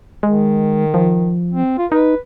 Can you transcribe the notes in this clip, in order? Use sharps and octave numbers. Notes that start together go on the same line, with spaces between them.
D#3 G#3
F3
C4
F4
D#4 B4